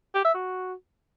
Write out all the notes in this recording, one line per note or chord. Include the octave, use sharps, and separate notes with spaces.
G4
E5
F#4